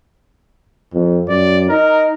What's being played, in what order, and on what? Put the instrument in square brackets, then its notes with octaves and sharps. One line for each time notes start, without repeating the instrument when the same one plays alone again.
[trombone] F2
[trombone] F#2 [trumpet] D5
[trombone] D#4 [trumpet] A#4